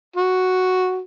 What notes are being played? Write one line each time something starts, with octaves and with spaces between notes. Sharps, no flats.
F#4